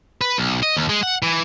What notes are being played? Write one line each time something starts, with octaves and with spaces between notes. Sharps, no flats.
B4
B1
D#5
D#2
G#3
F#5
E3